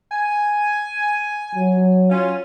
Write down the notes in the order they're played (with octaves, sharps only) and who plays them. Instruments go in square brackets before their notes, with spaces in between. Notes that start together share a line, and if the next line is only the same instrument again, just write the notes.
[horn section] G#5
[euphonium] F#3
[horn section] C#4 F4